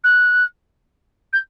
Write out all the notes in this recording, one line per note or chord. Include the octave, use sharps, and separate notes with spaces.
F#6
G6